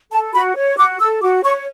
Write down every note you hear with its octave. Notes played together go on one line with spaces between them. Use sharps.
A4 A5
F#4 B5
C#5
F#4 D6
A4 E6
F#4 D6
C#5 C#6